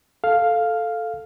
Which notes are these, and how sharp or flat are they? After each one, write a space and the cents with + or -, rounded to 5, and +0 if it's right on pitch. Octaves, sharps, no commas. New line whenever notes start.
A4 +0 F5 +0